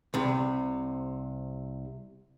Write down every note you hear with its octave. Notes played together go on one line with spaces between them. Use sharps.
C2 C3